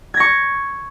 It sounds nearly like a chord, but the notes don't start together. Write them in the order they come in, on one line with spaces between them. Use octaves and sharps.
G#6 A#6 C#6